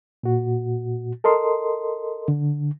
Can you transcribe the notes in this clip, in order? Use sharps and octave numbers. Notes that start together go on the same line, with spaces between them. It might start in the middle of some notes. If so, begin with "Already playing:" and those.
A#2 F#4
A4 A#4 D#5 C6
D3